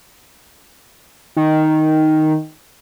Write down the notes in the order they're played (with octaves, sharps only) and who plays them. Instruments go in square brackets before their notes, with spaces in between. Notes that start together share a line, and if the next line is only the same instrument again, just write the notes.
[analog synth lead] D#3